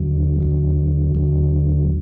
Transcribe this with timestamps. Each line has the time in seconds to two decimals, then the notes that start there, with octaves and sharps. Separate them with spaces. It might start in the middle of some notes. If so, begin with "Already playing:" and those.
Already playing: D#2 D3 F#3
0.40 D#2 D3 F#3
1.15 D#2 D3 F#3